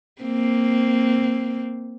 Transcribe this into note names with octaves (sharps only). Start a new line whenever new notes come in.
A#3 C4